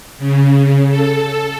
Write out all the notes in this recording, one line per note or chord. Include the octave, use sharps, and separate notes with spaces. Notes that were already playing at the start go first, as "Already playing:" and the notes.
C#3
A4